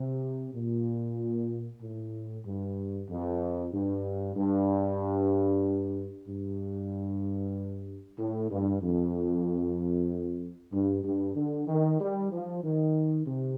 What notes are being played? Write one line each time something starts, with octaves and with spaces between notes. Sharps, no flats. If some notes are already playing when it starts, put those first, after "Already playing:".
Already playing: C3
A#2
A2
G2
F2
G2
G2
G2
A2
G2
F2
G2
G2
D3
D#3
G3
F3
D#3
C3